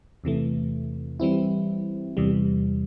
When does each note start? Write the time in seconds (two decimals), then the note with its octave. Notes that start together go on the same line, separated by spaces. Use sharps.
0.24 E2 C3 E3 A3
1.20 E3 G3 C4 E4
2.17 E2 C3 E3 G3